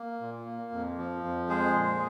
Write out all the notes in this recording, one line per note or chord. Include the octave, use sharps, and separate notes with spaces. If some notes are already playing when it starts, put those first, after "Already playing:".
Already playing: A#3
A#2
A#3
F2
F3
F2
G#3 G#4 C5
A#2